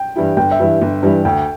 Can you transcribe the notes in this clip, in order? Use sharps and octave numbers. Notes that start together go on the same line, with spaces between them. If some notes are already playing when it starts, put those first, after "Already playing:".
Already playing: G5
G2 E3 G3 E4
G1 G5
E5
G2 E3 G3 E4
G1
G2 E3 G3 E4
D2 G5